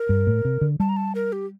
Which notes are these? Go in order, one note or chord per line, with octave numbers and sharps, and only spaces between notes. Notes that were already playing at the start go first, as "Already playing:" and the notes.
Already playing: A#4
G2
A2
C3
D3
G3 A5
A#5
A5
A#4
G4